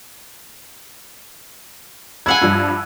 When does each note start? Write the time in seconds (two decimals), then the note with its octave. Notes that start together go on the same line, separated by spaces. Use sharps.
2.26 E4 F5 F#5 G#5 E6 G#6
2.41 G2 F3 G3